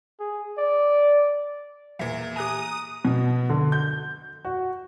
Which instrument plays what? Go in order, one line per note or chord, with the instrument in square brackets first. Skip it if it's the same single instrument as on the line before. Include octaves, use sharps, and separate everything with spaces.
[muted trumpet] G#4
D5
[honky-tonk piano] E2 A#2 [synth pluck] E5
[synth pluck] G4 G#5 [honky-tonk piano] A#5 F#6 [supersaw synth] D#6
[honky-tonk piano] B2
D3
G6
F#4